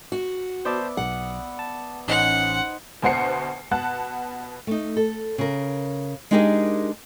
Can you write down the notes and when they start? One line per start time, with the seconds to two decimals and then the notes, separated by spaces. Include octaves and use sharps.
0.12 F#4
0.65 B3 C5 D5 E5 A5
0.97 B1 F#5
1.59 A5
2.08 A1 C#4 D#4 C5 F#5 C6
3.02 D2 B2 C5 F#5 C7 C#7
3.71 B2 F#5 A5 F#6
4.67 A3 D#4
4.97 A4
5.38 C#3 A#4
6.31 G#3 D4 D#4 G4 G#4 A#4